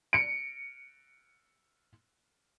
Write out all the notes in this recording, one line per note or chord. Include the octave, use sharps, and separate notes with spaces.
C#7 D7